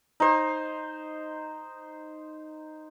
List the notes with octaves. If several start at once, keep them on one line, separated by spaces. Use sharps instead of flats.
D#4 C5